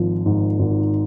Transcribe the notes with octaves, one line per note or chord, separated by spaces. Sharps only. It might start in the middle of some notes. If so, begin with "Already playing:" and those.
Already playing: G#1 F3
G#2
G#1